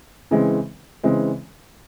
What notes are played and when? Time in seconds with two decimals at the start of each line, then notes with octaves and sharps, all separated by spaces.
0.31 C#3 E3 G#3 C4
1.04 C#3 E3 G#3 C4